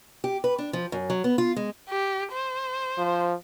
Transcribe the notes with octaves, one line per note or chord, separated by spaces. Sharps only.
G4
B4
D4
F3
F#2
F#3
B3
F4
G#3
G4
C5
F3